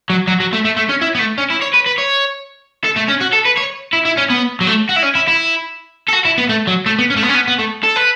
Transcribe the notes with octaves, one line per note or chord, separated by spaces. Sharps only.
F#3
F#3
F#3
A3
A3
A3
C#4
E4
B3
A3
C#4
E4
C#5
B4
B4
C#5
A4
A3
C#4
F#4
A4
B4
C#5
E4
E4
C#4
B3
F#3
A3
F#4
E4
C#4
E4
E4
A4
F#4
E4
B3
A3
F#3
A3
B3
C#4
A3
B3
C#4
B3
B3
A3
A4
B4